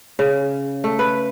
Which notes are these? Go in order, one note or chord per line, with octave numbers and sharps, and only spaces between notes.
C#3
A3
B4